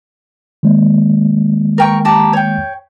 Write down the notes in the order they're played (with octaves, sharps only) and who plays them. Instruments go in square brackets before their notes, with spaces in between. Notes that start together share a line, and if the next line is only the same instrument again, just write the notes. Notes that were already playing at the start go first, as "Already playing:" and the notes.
[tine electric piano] D#3 G#3 A#3
[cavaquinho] A#4 G5 C#6
G4 A5 A#5
C#5 G5